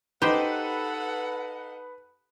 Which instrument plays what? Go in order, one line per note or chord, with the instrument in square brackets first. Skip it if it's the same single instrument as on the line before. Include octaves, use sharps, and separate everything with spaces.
[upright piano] D#4 [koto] G4 C5 [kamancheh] A4 F#5 [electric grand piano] B4